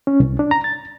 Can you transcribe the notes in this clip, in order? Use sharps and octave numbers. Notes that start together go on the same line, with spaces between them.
C#4
C2
D4
A#5
A6